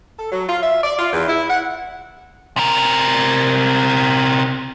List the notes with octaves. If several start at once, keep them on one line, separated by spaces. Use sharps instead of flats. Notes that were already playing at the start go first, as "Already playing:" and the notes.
A4
F#3
F4
E5
D5
F4
E2
E4
F#5
C3 A#4